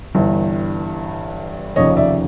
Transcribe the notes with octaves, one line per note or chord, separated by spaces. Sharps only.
G1 G2 E3
F1 D#2 C#3 F3 C#5 D#5
D5 E5